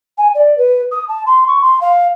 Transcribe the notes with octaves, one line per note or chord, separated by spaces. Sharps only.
G#5
D5
B4
D#6
A5
C6
C#6
C6
F5